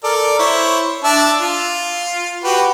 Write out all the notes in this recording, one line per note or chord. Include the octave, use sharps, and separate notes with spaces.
A4 A#4 D5
E4 C5 C#5
D4 E5 A5
F4
F#4 G4 B4